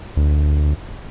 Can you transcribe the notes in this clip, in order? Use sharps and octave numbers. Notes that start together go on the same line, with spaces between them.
D2